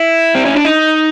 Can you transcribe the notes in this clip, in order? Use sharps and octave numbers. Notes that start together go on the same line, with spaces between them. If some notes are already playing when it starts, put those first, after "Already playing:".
Already playing: E4
C4
C#4
D4
D#4